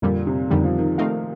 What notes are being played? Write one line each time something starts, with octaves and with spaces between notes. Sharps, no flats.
F2 A#2 D3 G3
C3
F2 D3 D#3 G3
F3
D#3
A3 C4 D#4 A#4 F5